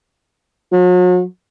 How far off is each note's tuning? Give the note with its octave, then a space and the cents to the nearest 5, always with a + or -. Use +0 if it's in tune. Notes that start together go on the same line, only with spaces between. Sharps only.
F#3 -40